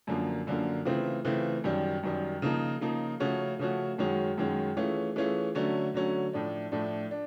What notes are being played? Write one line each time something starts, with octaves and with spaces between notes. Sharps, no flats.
F#2 D3 F3 A#3
F#2 D3 F3 A#3
C#3 E3 A3 C4 F4
C#3 E3 A3 C4 F4
F#2 D#3 G3
F#2 D#3 G3
C#3 F3 A#3 D#4
C#3 F3 A#3 D#4
C#3 F3 A3 C#4 F#4
C#3 F3 A3 C#4 F#4
F#2 D#3 G#3 C#4 F#4
F#2 D#3 G#3 C#4 F#4
E3 A3 C#4 F4 G#4
E3 A3 C#4 F4 G#4
D3 F#3 A3 C#4
D3 F#3 A3 C#4
A2 F3 A3 D4
A2 F3 A3 D4
D4